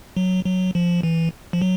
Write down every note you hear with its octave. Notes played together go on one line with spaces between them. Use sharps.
F#3
F#3
F3
E3
F3
F#3